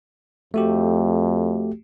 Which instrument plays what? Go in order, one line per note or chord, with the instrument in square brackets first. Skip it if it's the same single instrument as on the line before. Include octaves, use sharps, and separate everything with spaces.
[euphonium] F2 [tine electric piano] A3 F#4 G4